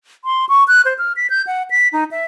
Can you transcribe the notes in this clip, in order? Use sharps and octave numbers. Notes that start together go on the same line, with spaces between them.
C6
C#6
F#6
C5
F6
B6
G6
F#5
B6
D#4
E5